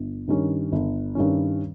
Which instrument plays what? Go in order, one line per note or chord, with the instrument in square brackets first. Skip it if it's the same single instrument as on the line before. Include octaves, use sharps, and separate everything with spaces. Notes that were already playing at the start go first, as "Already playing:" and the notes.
Already playing: [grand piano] G1
G2 D#3 G3 C#4
G1
G2 D#3 G3 C#4